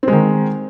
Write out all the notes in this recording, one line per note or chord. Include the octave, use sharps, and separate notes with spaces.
D#3 G#3 C4